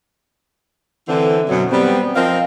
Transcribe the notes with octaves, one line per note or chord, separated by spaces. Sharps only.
D3 E3 C4
F#2 B2 F#3
G3 B3 C4
F3 C4 A#4 C5 D#5 F5